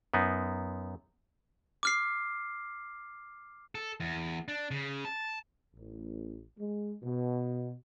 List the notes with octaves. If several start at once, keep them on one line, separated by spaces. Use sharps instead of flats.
F#2 B3 D#4
D6 F6 C7
A4
E2
D4
C#3
A5
A1
G#3
B2